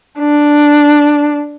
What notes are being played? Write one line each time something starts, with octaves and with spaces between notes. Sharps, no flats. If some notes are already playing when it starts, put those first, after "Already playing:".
D4